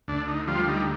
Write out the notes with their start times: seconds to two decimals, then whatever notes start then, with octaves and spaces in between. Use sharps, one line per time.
0.08 D2 D4
0.28 D#4
0.47 F3 G3 F4
0.68 D#4